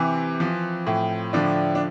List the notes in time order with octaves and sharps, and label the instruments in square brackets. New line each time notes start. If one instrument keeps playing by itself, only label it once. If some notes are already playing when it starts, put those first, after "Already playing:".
Already playing: [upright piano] C3 E3 C4
F3
A2
D3 F3 D4
D4